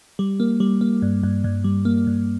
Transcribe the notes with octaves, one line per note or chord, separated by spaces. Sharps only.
G3
A#3
G3
A#3
G2
G2
G2
G3
A#3
G2